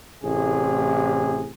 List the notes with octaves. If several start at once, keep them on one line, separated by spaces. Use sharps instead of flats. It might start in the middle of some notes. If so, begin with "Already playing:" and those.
A1 A2 C3 G#4